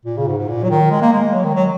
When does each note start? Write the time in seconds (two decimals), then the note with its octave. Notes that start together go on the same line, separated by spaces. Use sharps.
0.05 A#2
0.17 C#3
0.27 G#2
0.38 G#2
0.48 A#2
0.64 F#3
0.70 D#3
0.91 G#3
1.02 A#3
1.12 G#3
1.33 F#3
1.44 D#3
1.54 F#3